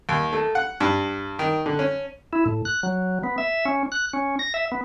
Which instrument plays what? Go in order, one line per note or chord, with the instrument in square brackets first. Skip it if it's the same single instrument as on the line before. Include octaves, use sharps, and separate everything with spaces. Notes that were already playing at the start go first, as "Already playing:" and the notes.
[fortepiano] D#2
A3
F#5
G2
D#3
D3
C#4
[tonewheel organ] E4
A2
F#6
F#3
B3
E5
C#4
F#6
C#4
A#6
E5
B3